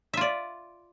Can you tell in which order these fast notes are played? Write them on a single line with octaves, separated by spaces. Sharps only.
E5 F4 D5